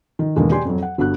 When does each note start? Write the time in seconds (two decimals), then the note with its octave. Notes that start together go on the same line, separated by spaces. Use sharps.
0.19 D#3
0.36 E2 B2 D3 D#3 G#3 A#3
0.51 G4 D5 G#5 C6
0.65 F2 F#3
0.82 F#5
0.98 G1 B3 D4 F#4 F#6